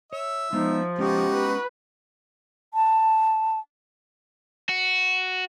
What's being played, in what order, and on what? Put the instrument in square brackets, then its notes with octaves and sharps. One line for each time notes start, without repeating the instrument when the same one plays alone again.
[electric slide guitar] C#5 [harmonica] E5 E6
[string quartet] F3 [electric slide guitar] G#3 B3 [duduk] D#4
[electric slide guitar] G#3 B3 C#4 [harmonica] D#4 F#4 [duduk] G4
[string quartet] B4
[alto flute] A5
[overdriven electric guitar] F#4